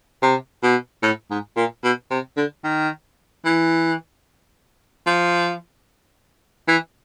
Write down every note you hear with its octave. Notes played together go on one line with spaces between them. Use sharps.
C3
B2
A2
G#2
A#2
B2
C3
D3
D#3
E3
F3
E3